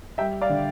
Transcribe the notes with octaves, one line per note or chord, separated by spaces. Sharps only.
G3 E5 G5
D5 F5
D3